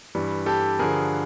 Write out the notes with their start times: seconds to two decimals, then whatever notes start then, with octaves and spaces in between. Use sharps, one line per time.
0.15 G2 E3 G3
0.46 G4 A4
0.79 G2 D3 F3 G#4 A#4